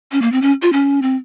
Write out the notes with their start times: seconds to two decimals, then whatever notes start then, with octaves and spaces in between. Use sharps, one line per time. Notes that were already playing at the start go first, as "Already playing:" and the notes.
0.12 C#4
0.22 A#3
0.32 C4
0.42 C#4
0.62 F4
0.73 C#4
1.02 C4